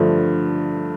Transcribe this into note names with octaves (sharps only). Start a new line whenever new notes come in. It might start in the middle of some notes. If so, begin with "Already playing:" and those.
Already playing: G2 D3 F3 A3